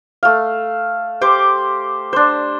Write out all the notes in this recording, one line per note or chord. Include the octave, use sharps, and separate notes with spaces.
A3 F5
G4 C5 D6
D4 C5